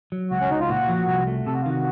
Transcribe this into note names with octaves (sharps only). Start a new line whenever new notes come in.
F#3
C#2 F#4
C#4
C#2 D#4
F4
A#2 F#4
F3
C2
A3
C3 A4
F#4
F4
D#3 F#4